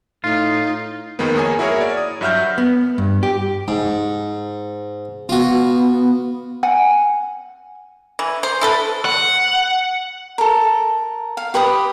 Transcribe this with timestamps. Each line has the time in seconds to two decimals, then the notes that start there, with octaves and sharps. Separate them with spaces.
0.24 A2 D#4 F4
1.19 F2 D#3 G#3 A#3 B3
1.35 F2 A#3 G#4 C#5 G#5
1.59 E4 F#4 G#4 A#4 C#5
1.81 D5
1.97 D#6
2.21 G2 F#3 E5 F#5 F6 G6
2.58 B3
2.98 G2
3.23 G4
3.68 G#2
5.29 B3 F4 F#4
6.63 F#5 G#5
8.19 E3
8.43 C5
8.61 E4 A4 B4
9.05 F#5
10.38 A4 A#4
11.37 F5
11.54 G4 B4 B5 D#6